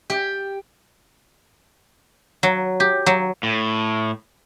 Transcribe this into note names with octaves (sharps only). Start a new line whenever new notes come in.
G4
F#3
G4
F#3
A2